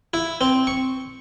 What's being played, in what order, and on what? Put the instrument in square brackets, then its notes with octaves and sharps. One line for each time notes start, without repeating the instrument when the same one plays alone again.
[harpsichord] E4
C4
C#6